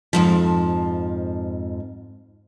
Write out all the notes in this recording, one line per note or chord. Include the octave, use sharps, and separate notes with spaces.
F2 G#2 F3